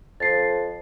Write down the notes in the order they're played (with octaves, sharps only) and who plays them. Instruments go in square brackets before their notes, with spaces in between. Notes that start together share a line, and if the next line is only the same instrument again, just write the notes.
[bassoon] F2 [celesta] A6 C7